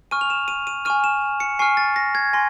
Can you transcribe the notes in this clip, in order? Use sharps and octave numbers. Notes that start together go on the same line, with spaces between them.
G#5 C#6 F6 D#7
F7
E7
D#7
D#7
G#5 C#6 F6 D#7
E7
C#7
G#5 C#6 F6 C7
A6
A#6
G#6
G#5 C6 A#6